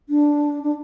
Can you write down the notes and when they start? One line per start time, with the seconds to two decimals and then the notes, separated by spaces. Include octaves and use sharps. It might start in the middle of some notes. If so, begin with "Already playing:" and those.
0.09 D4
0.63 D4